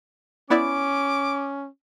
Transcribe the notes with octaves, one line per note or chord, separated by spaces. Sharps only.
B3 C#4 E4 D5 D6